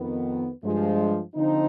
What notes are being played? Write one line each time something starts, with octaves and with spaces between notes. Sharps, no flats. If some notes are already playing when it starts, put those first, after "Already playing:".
Already playing: F2 D#3 B3
G2 F3 G#3
D3 F3 C4 D#4